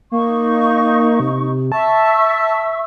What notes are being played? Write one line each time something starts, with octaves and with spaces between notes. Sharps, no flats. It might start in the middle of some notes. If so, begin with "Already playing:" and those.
A#3 D#4 C#6
C3
C3
E5 A5 C#6 E6